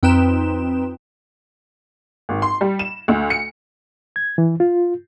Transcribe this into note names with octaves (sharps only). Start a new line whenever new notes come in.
F2 C4 D#4 B4 G5 E7
G#1
C6
G3
E7
D2
C#7
G#6
E3
F4